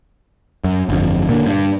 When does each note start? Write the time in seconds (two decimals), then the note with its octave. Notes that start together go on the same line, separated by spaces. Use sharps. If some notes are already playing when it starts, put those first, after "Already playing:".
0.64 F#2
0.89 G1 F2
1.29 A#2 D3
1.46 G2